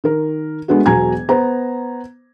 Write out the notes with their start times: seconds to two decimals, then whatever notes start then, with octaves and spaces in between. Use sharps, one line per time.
0.04 D#3 A#4
0.68 G#3 A3 B3 D4 F#4
0.86 E1 B2 F#3 G#5 A#5 G#6
1.29 B3 C5 A#5